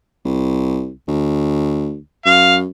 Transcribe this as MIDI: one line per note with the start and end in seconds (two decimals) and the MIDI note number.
0.25 0.91 36
1.08 1.98 38
2.26 2.66 42
2.26 2.55 77